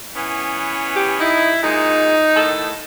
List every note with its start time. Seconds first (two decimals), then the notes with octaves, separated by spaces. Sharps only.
0.15 E3 B3 C#4
0.96 G4
1.20 D#4 E4
1.63 A#2 G#3 D#4
2.36 A2 D#3 A4